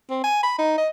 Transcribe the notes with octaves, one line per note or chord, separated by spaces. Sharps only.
C4
G#5
B5
D#4
D#5